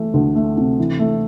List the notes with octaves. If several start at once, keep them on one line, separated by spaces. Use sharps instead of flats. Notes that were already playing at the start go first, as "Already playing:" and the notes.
Already playing: E3 A3
D2
A3
C3
E3
A3